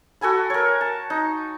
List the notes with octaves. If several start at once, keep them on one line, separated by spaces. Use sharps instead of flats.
F#4 A4 G#5 B5
A#4 C#5
A5
D#4